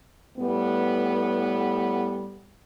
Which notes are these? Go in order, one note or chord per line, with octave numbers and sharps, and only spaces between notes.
A2 G3 B3